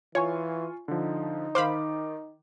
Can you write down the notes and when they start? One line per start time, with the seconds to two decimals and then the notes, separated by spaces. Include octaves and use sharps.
0.15 E3 F4 C#5 G#5 C#6
0.88 D3 F3 D#4
1.55 D#3 C5 F5 B5 D6